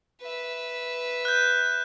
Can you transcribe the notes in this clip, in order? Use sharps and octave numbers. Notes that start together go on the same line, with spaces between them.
B4 E5
F#6 G6